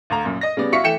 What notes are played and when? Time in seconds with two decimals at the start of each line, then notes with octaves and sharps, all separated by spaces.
0.10 D2 F5 A#5
0.25 F#2 A#2
0.41 D#5 A#6
0.57 C#3 G3 B3 D5
0.72 E4 F#4 F5 C#6 B6 C#7
0.84 E3 A3 G5 C#7 E7